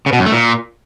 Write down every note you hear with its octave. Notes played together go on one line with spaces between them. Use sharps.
C#3
B2
F#2
A3
A#2